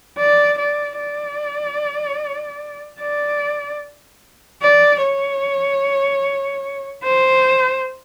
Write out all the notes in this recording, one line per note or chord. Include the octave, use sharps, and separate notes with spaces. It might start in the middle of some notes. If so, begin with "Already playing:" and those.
D5
D5
D5
D5
D5
C#5
C5